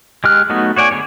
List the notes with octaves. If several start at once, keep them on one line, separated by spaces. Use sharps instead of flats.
G#3 G4 F6 F#6
F#3 A3 B3 D#4 F#4
F#4 C#5 D5 G5 G#5
D3 B3 G#4 C#5